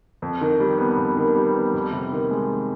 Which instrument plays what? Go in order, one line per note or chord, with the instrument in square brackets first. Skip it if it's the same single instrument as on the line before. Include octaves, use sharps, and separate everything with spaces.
[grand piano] F2
D#3
G3
B3
F2
D#3
G3
B3
F2
C3
D#3
G#3